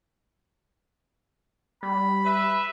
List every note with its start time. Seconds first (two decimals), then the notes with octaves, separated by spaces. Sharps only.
1.83 G3 B5
2.25 B4 E5